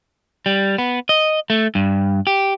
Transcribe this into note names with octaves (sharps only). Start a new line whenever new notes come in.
G3
B3
D#5
A3
G2
G4